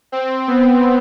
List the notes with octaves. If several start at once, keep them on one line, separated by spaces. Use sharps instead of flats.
C4
B3